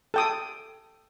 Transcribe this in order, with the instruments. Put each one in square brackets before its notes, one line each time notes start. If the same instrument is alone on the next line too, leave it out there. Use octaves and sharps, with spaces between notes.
[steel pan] A4 G5 D#6